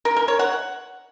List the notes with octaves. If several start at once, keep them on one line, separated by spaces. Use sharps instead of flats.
A#4
A#4
C#5
F#5